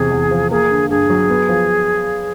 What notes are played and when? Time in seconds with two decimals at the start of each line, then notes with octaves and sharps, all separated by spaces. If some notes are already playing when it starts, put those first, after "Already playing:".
Already playing: E2 C3 G#4
0.11 E2
0.31 F3
0.51 A#3 G#4
0.71 D3
0.90 G2 G#4
1.10 F#3
1.30 B3
1.49 F3